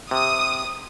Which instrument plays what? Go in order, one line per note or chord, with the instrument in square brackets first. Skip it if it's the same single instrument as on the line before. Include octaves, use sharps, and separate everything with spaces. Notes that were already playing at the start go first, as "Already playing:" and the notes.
[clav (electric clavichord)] C3 [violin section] D#6